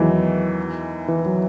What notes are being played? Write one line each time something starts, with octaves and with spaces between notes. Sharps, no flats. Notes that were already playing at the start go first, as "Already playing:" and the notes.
Already playing: E2 D#3 E3 F#3 G#3
E3
F#3